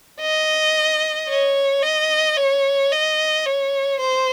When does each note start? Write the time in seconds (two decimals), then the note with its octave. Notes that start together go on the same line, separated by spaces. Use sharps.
0.21 D#5
1.29 C#5
1.83 D#5
2.37 C#5
2.92 D#5
3.46 C#5
4.00 C5